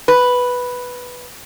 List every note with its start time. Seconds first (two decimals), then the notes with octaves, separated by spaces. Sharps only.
0.08 B4